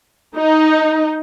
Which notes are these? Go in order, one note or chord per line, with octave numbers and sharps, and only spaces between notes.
D#4